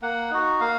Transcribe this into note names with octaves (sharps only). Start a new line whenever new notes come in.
A#3 F#5
D#4 F#4
A#3 F5